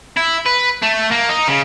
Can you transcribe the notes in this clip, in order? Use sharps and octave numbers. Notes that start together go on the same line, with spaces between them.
E4
B4
A3
A#3
D#4
C#3